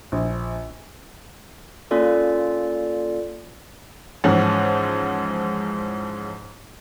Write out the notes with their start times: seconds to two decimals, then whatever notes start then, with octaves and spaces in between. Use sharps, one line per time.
0.12 A#1
1.91 A#3 C#4 F4 A4 D5
4.24 G#2 E3 F3 C#4 F#5